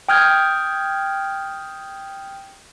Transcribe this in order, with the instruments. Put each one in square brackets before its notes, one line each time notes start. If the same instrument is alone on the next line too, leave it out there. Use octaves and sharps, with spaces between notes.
[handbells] G5 D#6 F6 G6 G#6